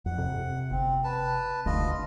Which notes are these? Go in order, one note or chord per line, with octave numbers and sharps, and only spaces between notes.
F2 F#5
F2 C3
G1 C4
B4 A5
F1 D2 F4 D#5